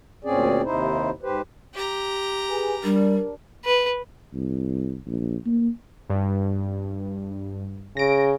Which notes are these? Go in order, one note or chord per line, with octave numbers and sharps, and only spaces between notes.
D2 A#2 C4 C#4 G#4 D5
D#2 C3 D#4 E4 C5
G#2 G4 B4 C5
G4 A#5
G#4 B4 G#5
G3 D4 A#4
B4
C2
A#1
A#3
G2
C#3 A#6 D7